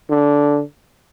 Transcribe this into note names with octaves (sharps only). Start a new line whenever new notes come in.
D3